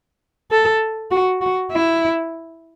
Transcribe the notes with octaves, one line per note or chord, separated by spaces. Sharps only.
A4
F#4
F#4
E4